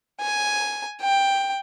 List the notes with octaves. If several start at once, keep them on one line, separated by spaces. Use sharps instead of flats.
G#5
G5